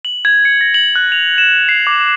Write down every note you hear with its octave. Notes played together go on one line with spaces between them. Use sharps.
F#7
G#6
C#7
A#6
F#7
F#6
F7
E7
C7
D6